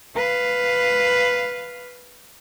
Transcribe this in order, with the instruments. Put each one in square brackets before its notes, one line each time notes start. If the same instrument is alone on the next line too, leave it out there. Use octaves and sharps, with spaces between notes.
[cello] B4 F5